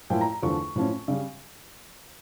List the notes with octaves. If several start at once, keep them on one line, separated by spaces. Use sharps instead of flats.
A2 F3 A#3 E4 G5
A#5
A#5
E2 D3 F3 A3 C#6
A2 F3 C#4
C#3 G3